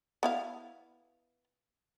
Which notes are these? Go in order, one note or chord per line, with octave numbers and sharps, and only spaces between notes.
B3 E4 F5